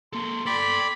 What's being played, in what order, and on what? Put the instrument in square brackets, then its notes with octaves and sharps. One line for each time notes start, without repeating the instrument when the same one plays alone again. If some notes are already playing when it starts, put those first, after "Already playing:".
[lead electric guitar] A#3 A4 [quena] C6
[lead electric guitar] A4 G5 [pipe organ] D5 B5